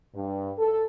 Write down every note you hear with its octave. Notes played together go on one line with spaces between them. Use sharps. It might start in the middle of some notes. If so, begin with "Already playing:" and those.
G2
A4